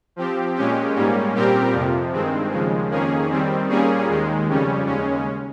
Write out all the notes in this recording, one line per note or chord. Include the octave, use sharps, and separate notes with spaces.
F3 C4 G4
A#2 G#3 C#4 G4
G#2 G3 A#3 C#4
A#2 G3 C4 G4 A#4
F2 C3 F3
G2 D#3 G#3 C4
D#2 C#3 F3 G#3
F2 D#3 A#3 C#4 G#4
D#3 G3 C4
A#2 G3 A#3 C#4 G#4
D#2 D#3 G#3
F2 C#3 G3 C#4
D#2 C#3 G#3 C#4